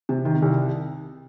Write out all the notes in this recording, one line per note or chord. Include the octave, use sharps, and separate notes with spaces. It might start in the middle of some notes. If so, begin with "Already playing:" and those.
C3
D#3
C2